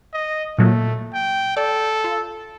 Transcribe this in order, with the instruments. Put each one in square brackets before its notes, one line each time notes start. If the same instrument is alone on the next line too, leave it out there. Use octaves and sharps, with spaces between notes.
[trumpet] D#5
[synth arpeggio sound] A#2 F#3 A#3 [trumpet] A3
[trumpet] G5
[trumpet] A4 [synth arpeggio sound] D5
[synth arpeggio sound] F4